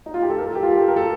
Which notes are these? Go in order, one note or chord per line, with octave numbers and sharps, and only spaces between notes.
D#4
F4
G4
A4
A#4
A4
G4
F4
G4
A4
A#4
A4